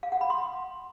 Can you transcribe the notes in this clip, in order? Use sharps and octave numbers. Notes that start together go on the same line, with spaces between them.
F5
F#5
B5
C6